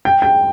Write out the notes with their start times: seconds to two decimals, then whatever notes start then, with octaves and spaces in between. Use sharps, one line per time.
0.05 G5
0.22 G5